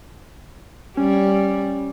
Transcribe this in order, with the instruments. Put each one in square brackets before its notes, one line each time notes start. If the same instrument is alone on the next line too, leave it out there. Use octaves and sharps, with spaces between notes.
[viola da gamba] G3 [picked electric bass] C#4